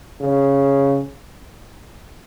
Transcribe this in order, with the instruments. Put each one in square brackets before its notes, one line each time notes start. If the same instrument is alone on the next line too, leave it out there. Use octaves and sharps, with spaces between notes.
[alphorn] C#3